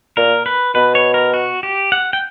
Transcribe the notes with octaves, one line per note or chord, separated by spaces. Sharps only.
A#2 A#4
B4
B2 B4
C#5
A#4
F#4
G4
F#5
G5